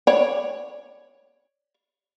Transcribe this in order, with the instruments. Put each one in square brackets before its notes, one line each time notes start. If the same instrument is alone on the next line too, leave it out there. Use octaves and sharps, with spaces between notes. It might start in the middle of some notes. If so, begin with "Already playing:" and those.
[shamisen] C#5 D5